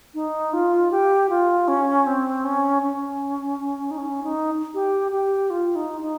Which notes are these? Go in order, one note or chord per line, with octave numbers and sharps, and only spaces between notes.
D#4
F4
G4
F4
C#4
C4
C#4
C#4
D#4
C#4
D#4
G4
G4
F4
D#4
D#4